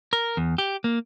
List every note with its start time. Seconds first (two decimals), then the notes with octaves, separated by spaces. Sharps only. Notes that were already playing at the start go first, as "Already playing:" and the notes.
0.13 A#4
0.37 E2
0.58 G4
0.84 A#3